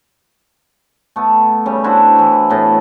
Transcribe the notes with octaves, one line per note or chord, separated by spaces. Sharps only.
A3 B3
C#3 G3
D4 E4 F#4 C5
E3 E4
B4
A2 B3